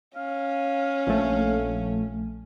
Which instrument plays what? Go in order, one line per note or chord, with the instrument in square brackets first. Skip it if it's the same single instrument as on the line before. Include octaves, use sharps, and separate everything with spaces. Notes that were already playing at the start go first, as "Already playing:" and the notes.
[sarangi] C#4 [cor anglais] F5
[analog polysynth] A#1 A3